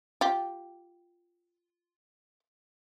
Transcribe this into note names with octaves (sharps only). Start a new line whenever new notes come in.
F4 G4